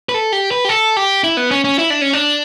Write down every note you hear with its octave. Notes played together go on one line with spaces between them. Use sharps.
B4
A4
G4
B4
G4
A4
G4
E4
B3
C#4
C#4
E4
D4
C#4
D4